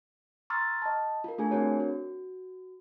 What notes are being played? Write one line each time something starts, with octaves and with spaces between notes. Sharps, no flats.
A#5 C6 C#6 E6 F6 A6
D#5 A5
F4 A#4
A3 D4 F4 G#4 A4 G#5
C4 D4 F#4 A#4 C#5
F#4